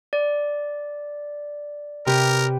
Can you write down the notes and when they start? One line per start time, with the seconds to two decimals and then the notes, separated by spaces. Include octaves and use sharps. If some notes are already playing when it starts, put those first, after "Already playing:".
0.13 D5
2.06 C3 G4 A#4 B4